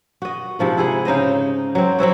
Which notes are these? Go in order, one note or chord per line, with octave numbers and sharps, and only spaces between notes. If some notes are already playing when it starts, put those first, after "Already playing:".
F#4 D#5
G#2 C3 F3 F#5
E4 G#4 F#5
C#3 D#4 C5 D#5
F#3 C4
F#3 C4 E4 F#4